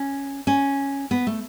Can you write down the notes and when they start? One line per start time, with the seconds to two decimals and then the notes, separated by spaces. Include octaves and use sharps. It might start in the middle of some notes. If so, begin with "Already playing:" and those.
Already playing: C#4
0.47 C#4
1.11 B3
1.27 A3